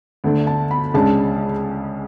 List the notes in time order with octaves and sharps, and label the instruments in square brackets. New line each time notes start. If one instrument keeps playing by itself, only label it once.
[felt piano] D2 D3 A3 D4
A5
B5
C#2 C#3 G#3 D4 A5